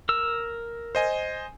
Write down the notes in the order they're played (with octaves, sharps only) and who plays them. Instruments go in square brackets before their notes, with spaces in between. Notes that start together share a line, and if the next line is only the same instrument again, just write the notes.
[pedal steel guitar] A#4 E6
[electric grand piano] C5 D#5 G#5